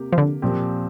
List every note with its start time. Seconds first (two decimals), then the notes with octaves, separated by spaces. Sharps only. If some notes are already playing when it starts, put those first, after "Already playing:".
Already playing: C3 A#3 G4
0.13 F3
0.18 D3
0.42 A#2 F3 C4 G4